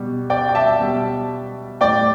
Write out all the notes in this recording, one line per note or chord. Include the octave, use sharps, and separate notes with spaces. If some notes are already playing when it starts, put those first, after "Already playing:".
Already playing: B2 G3
D5 G5
G5
E5 A5
B2 G3
A2 G3 D5 G5